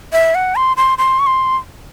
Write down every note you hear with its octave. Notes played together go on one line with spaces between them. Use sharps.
E5
F#5
C6
C6
C6
C#6
C6